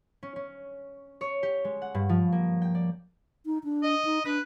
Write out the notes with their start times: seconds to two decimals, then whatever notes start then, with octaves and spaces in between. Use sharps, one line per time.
0.23 C#4
0.36 C#4
1.21 C#5
1.43 G4
1.64 G#3
1.82 F#5
1.95 G2
2.09 F3
2.32 A#3
2.62 G5
2.75 D5
3.46 D#4
3.64 D4
3.83 D#5
4.05 D#4
4.26 D4 B4